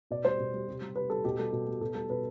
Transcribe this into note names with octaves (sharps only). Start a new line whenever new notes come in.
B2 D5
G3 C5
B2
G3
C3
G3
C3 B4
G3 A4
B2 G4
G3 A4
B2
G3
B2 A4
G3 A4
B2 B4